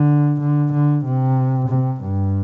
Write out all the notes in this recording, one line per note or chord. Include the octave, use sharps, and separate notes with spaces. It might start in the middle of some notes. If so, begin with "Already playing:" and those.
Already playing: D3
D3
D3
C3
C3
G2